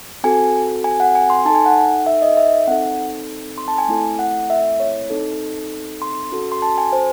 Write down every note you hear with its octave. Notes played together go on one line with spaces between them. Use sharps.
C4 F#4 A4 G#5
G#5
F#5
G#5
C6
D#4 A4 A5
G#5
F#5
E5
D#5
E5
C4 D#4 A4 F#5
C6
A5
G#5
A3 C4 E4 A4
F#5
E5
C#5
C4 D#4 A4
C6
C#4 F#4 A4
C6
A5
G#5
C5